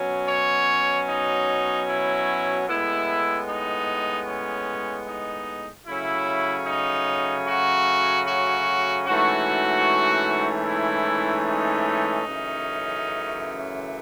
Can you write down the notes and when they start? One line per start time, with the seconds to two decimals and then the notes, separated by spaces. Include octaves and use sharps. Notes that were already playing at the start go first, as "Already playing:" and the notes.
Already playing: B2 F#3 C#4
0.29 C#5
1.08 D#4
1.88 E4
2.68 A2 G#3 B3 E4
3.48 D#4
4.27 C#4
5.08 D#4
5.87 C#3 F#3 A3 C#4 E4
6.67 D#4
7.47 F#4
8.27 F#4
9.06 G#2 E3 A3 C#4 F#4
10.66 E4
11.46 D#4
12.25 F#2 C#3 E3 A3 C#4